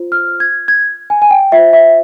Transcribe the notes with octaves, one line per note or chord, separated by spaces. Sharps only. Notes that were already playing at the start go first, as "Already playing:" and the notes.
Already playing: F4 C5
F6
G#6
G#6
G#5
G#5
G5
F4 C5 E5
E5